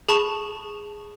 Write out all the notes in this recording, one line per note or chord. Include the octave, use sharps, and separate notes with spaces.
G#4 A5 B5 C#6 E7 F7